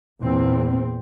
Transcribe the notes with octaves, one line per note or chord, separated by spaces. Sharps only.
E2 A#2 C4